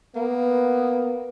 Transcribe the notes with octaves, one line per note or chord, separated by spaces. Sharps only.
A#3 B3